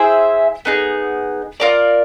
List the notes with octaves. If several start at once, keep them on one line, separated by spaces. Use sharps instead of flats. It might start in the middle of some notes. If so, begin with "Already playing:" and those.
Already playing: E4 G#4 C5 E5
B3 D#4 G#4
F4 A#4 D5